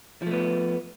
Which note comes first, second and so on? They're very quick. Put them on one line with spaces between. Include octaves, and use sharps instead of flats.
F3 A3 B3